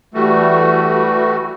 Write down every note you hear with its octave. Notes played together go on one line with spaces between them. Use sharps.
E3 G3 A3 F#4